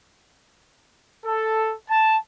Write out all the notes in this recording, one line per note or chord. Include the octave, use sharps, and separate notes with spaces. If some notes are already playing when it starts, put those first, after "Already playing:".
A4
A5